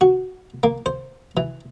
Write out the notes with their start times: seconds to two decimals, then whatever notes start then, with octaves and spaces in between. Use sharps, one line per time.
0.01 F#4
0.63 A#3
0.86 C5
1.37 E3